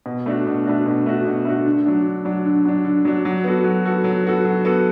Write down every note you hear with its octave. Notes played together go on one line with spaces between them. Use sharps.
B2
A3 D4 F#4
B2
A3 D4 F#4
B2
A3 D4 F#4
B2
A3 D4 F#4
D3
F#3 D4
D3
F#3 D4
D3
F#3 D4
D3
F#3 D4
F#3
B3 F#4 A4
F#3
B3 F#4 A4
F#3
B3 F#4 A4
F#3
B3 F#4 A4